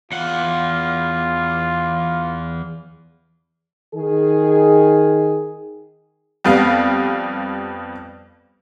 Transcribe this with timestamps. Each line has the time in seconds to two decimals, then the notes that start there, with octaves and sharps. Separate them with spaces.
0.12 E2 F4 F#5
3.95 D#3 G#4
6.44 F2 G3 B3 F5